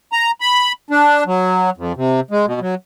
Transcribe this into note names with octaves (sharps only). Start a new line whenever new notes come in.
A#5
B5
D4
F#3
F2
C3
G#3
B2
F#3